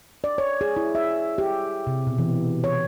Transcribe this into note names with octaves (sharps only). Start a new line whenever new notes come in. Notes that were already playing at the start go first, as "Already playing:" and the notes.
D5
C#5
G#4
E4
E5
G4
C3
B2
E3
C#5